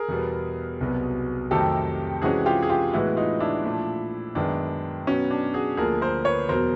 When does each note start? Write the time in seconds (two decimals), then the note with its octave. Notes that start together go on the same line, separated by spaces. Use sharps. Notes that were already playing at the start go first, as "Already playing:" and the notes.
Already playing: G#4 A#4
0.08 E2 B2 G3 B3
0.81 C2 B2 F#3 B3
1.51 F2 C3 D#3 F#3 A3 G4 A4
2.22 C3 E3 G#3 C#4 F#4 G#4
2.46 F4 G4
2.62 G#4
2.70 F4 G4
2.93 A2 E3 G#3 B3 E4 F#4
3.17 D#4 F4
3.40 D4 E4
3.64 A#2 F3 A3
4.35 F#2 D#3 G#3 B3 D4
5.07 B2 F#3 B3 C#4
5.31 D4
5.54 F#4 G#4
5.77 D2 D3 F3 A#3 G#4 A#4
6.02 A#4 C5
6.25 B4 C#5
6.49 E2 B2 F#3 A#4 C5